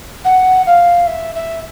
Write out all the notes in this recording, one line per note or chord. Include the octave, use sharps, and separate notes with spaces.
F#5
F5
E5
E5